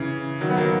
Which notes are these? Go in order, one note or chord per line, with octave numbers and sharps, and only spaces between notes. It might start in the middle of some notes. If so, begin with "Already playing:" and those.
Already playing: C#3 E3
D#3 F#3
B3
F#3 A#3